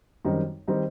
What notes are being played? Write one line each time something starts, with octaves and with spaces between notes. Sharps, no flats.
F#2 D#3 G3 C4 D#4
D#3 G3 C4 D#4